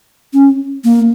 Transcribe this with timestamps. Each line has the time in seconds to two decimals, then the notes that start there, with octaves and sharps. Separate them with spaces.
0.33 C#4
0.84 A#3